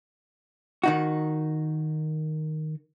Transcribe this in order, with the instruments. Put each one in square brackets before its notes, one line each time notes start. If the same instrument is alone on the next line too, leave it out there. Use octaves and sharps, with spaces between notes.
[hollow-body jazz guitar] D#3 D#4 F#4